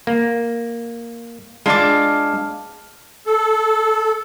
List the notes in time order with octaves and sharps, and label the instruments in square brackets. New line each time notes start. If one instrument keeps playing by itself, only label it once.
[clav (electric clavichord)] A#3
[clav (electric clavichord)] G#3 D4 [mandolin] F4 A5 D6
[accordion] A4